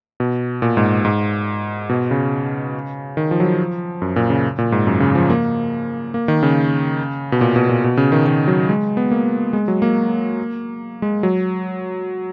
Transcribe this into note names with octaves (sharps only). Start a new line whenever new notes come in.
B2
A#2
G#2
G#2
B2
C#3
D#3
F3
F#3
F3
F#2
A#2
C#3
A#2
G#2
F#2
C#3
F3
A#3
A#3
D#3
C#3
B2
A#2
B2
A#2
B2
C#3
D#3
D#3
F#3
G#3
B3
A#3
G#3
F#3
A#3
G#3
F#3